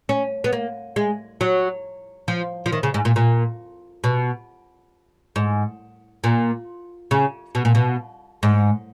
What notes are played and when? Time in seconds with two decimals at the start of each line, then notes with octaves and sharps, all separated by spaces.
0.09 C#4
0.44 B3
0.53 A#3
0.96 G#3
1.41 F#3
2.28 F3
2.66 F3
2.72 D#3
2.83 C#3
2.94 G#2
3.05 A#2
3.16 A#2
4.04 B2
5.36 G#2
6.24 A#2
7.11 C#3
7.55 B2
7.65 A#2
7.75 B2
8.43 G#2